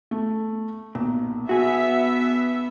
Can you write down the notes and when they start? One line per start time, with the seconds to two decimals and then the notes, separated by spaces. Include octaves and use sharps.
0.11 A3
0.95 B1 A#2
1.49 B3 F#4 G#4 E5